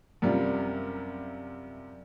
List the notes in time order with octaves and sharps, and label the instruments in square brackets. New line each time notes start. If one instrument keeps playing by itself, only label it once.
[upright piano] F#2 C3 G3 F4